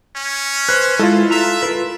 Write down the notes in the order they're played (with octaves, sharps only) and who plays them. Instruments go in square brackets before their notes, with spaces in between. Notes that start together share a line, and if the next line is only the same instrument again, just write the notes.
[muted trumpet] C#4
[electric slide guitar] B4 C5 [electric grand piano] F#6
[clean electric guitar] G#3 [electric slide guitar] E4 [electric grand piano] F4 A4
[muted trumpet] E5 [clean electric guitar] A#5
[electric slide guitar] F4 A#4 B4